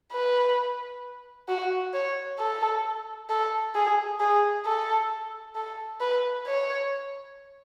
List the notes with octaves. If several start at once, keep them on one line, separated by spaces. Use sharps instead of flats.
B4
F#4
C#5
A4
A4
G#4
G#4
A4
A4
B4
C#5